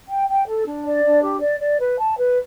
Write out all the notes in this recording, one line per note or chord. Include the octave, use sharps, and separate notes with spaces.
G5
G5
A4
D4
D5
D4
G4
D5
D5
B4
A5
B4